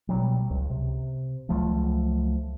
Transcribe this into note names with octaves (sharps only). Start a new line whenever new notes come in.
B2 F#3 G3
C#2
C3
C#2 F3 F#3 A3